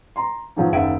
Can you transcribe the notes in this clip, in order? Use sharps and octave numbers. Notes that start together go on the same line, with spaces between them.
A#5 C6
G#2 B2 F3 F#3
F#1 D#2 E5 F#5 D7